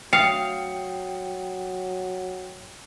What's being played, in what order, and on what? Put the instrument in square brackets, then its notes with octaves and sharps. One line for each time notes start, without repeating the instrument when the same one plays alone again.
[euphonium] F#3 [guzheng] F5 [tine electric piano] G5 [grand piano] D#6 C7 C#7